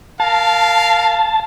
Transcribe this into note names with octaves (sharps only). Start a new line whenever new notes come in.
A#4 F5 A5